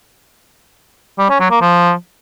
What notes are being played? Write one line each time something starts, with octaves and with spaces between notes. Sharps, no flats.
G3
C#4
F#3
A#3
F3